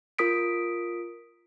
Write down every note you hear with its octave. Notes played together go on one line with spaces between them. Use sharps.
F4 A#4 D#6 B6 D7